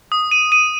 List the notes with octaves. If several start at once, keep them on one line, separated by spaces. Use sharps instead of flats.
D#6
D#7
D#7